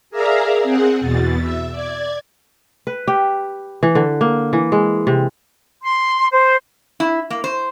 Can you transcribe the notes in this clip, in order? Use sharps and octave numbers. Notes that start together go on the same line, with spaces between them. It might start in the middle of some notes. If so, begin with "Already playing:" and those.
G#4 A#4 D5 E5 F5 A#5
C4 G#4 F#5
E2 B2 A6
E5
D5 G#6
B4
G4
E3
D3
A#3
E3
G#3
C3
C6
C5
E4
A#3
C5